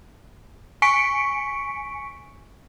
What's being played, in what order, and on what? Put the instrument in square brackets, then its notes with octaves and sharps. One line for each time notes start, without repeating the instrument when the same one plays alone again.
[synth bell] G#5 C#6 B6 C#7 D7